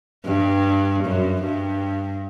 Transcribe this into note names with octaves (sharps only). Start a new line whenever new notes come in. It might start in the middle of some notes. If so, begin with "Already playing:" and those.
G2
F#2
G2